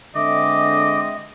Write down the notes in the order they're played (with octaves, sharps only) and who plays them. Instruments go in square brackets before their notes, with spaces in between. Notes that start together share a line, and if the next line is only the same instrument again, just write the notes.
[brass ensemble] D3 G#3 C4 [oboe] D#5 [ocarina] E5 [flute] D6